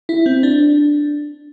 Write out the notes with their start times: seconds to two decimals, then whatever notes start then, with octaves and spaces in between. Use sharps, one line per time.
0.09 E4
0.26 C4
0.43 D4